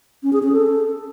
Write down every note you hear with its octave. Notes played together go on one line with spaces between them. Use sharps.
C#4
G#4
C#4
A4